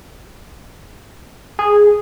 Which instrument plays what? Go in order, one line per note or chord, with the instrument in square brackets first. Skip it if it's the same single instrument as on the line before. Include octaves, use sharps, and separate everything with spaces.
[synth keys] G#4